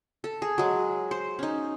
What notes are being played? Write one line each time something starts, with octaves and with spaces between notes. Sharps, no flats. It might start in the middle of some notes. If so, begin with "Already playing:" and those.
A4
G#4
F#3 G#3
C5
C#4 D#4